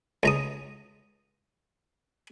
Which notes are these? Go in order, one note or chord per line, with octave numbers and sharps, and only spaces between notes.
C#2 A#5 D#6